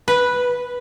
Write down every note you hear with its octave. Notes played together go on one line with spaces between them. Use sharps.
B4